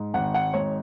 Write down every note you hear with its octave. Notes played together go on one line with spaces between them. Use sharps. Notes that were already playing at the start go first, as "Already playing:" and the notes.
Already playing: G#2
G#1 F#5
F#5
G#2 C#5